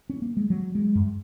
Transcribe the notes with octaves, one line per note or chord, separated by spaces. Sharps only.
C#4
A#3
G#3
F#3
G#3
F#2